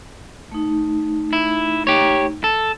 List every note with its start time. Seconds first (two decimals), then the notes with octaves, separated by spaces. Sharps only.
0.52 A3 D#4
1.33 E4
1.87 G4 C#5
2.44 A4